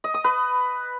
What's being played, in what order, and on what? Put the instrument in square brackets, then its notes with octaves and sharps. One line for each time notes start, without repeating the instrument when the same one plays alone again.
[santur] D#5
D#6
B4